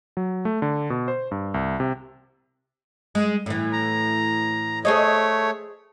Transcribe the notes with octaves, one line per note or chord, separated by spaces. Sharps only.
F#3
A3
D3
B2
C5
G2
C2
C3
G#3
A2 E3
A#5
A3 G#4 C5 C#5 D#5